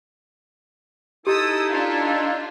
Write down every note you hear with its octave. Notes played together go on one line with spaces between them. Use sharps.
D#4 E4 G4 A4 D#6 E6
D4 F4